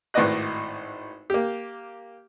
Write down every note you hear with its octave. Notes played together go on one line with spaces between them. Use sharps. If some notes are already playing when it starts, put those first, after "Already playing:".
G#1 A2 B4 D5 D#5 F#6
A#3 G4